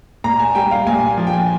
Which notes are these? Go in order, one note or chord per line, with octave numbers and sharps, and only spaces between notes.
A#2 A#5
G#5
G3 G5
F5
A#2 G#5
F3
G5
G#5